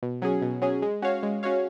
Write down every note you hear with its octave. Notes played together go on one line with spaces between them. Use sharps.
B2
F#3 C#4 G#4
B2
F#3 C#4 G#4
G#3
C#4 F#4 C#5 F5
G#3
C#4 F#4 C#5 F5